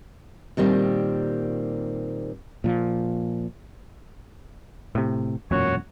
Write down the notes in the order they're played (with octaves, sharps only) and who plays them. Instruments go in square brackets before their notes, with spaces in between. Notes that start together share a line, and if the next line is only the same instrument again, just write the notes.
[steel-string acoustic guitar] A#2 D#3 G3 C4
[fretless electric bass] A#2 F3
[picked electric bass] A2 C3
[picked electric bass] E1 F#2 A#2 [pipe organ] F#4 C#5